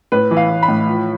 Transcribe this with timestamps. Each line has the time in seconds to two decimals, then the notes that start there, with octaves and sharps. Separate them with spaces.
0.12 A2 B4
0.31 E3
0.37 F5
0.50 E3
0.63 B5
0.68 A2
0.87 F3